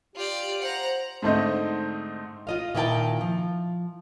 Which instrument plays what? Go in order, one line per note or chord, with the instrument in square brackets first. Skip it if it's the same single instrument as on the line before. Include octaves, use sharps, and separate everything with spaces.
[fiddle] F4 D5 [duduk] G4
[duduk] C5 [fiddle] F#5 A#5
[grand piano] G#2 D3 A3 C4 D#4 D#5
[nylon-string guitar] F4 D#5 F5
A#2 D#3 E4 A#4 G5 A5
F3